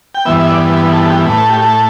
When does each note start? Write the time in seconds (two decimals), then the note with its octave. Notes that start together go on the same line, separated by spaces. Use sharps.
0.15 G5
0.25 G2 E3 B3 E5
0.40 E5
0.50 D5
0.76 B4
0.93 A4
1.05 A4
1.10 G4
1.26 A2 A3 B4
1.38 A4
1.50 G4
1.62 A4